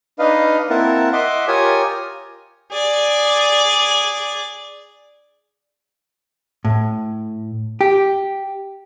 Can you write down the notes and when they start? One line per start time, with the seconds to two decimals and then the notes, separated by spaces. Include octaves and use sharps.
0.19 D4 D#4 B4 D#5 F5
0.70 A#3 C4 E4 A#4 F#5 A5
1.13 D#5 E5 F#5 C6 D6
1.48 F4 G4 A#4 C#5 G#5 D#6
2.72 G#4 D5
6.65 A2
7.81 G4